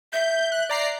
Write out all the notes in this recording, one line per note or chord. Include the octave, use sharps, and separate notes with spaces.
E5 G6
F#6
D5 A#5 C7